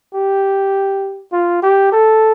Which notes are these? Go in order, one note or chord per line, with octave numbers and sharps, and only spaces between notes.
G4
F4
G4
A4